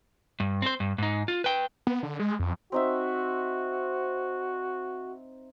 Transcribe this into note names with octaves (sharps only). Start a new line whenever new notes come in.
G2
C4 C5
G2
G#2 D#4
F4
B4 G5
B3
D3
G#3
F2
C4 D#4 F#4 E5